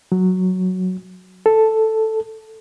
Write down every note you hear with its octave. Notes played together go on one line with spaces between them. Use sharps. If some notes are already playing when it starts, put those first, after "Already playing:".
F#3
A4